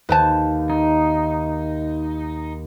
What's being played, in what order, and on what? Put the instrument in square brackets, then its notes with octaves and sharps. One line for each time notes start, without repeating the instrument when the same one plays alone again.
[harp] D#2 [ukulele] B4 C5 A5
[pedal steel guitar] D#4